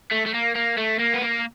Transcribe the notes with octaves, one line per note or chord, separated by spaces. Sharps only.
A3
A3
A#3
A#3
A3
A#3
B3
A#3